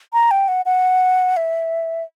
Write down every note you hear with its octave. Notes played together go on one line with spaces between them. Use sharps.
A#5
G5
F#5
F#5
E5